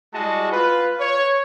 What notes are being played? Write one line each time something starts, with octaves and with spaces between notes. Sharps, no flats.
G3 G#3 E4 F#4 D#5 A5
F4 B4
C#5